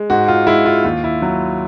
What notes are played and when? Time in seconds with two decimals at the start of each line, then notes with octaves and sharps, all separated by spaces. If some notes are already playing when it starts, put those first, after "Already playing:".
Already playing: G#3
0.10 G#2 F#4
0.28 F4
0.47 G#3 E4
0.66 F4
0.84 D#2 F4
1.04 E4
1.22 F#3